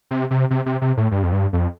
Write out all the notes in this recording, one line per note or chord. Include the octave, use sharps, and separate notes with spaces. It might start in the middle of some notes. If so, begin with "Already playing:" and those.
C3
C3
C3
C3
C3
A2
G2
F2
G2
F2